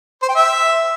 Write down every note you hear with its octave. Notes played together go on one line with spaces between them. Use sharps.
C5
G5
E5